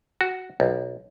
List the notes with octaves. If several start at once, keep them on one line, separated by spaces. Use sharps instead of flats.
F#4
B1